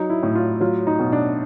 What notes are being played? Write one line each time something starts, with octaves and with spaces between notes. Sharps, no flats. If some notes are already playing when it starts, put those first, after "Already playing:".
Already playing: F#3 D#4
E4
A2
F4
F#3 F4
D#4
B2
D4